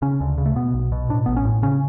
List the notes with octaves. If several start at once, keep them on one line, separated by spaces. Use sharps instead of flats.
C#3 C#4
D2
C#3
A3
B2 B3
B1
B2
A2 D4
A1 B3
C#4
A2
C#3 C#4